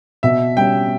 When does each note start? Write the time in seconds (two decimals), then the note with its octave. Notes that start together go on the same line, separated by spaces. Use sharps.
0.23 B2 E5
0.57 G3 C#4 G5